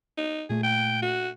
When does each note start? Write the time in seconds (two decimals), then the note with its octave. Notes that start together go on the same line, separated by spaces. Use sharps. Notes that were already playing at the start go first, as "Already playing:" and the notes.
0.18 D#4
0.49 A#2 A3 G#4
0.63 G5
1.02 F#4